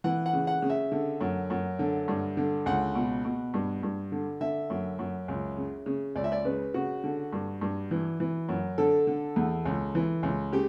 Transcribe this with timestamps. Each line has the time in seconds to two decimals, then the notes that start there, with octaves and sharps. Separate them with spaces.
0.04 E3 F#5
0.26 F#5
0.33 C#3
0.47 F#5
0.62 C#3
0.70 E5
0.92 D3
1.21 F#2
1.50 F#2
1.79 D3
2.08 G2
2.37 D3
2.66 C#2 F#5
2.95 B2
3.25 B2
3.54 G2
3.83 G2
4.12 D3
4.41 D3 E5
4.70 F#2
4.99 F#2
5.28 C#2
5.57 C#3
5.86 C#3
6.15 C#2 D5
6.24 E5
6.32 D5
6.45 C#3 B4
6.74 C#3 F#4
7.04 D3
7.33 G2
7.61 G2
7.91 E3
8.20 E3
8.49 F#2
8.78 D3 A4
9.07 D3
9.36 E2
9.65 C#2
9.95 E3
10.23 C#2
10.52 C#3 G4